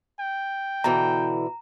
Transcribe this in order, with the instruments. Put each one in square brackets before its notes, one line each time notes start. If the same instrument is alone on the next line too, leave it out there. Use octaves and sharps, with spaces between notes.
[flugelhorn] G5
[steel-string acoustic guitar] B2 D3 E3 [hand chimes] A#5